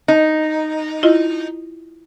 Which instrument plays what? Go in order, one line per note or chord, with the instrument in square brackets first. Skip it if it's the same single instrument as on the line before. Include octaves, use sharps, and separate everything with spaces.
[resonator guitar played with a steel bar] D#4
[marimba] E4 F4 D#5